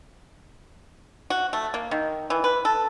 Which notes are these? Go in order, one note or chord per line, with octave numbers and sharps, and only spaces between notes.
F#4
A3
A#3
D#3
E3
B4
A4